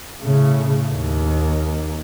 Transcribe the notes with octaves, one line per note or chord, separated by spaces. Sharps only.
A2 C#3
D#2